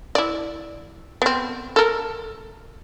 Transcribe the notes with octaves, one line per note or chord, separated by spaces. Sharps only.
E4 D5
B3 C4
A4 A#4